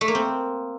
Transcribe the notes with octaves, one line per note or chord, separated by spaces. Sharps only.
A3
A#3
C4